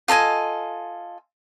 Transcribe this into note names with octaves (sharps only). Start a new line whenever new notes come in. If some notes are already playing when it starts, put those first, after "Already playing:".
F4 A4 D#5 G#5